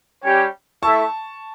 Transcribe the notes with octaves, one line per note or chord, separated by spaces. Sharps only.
G3 C#4 G4 C#5 G5
A3 E4 A4 E5 A5 C#6